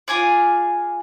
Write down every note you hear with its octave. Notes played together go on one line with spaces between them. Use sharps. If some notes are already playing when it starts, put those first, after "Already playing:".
F4 G#4 G#5 D6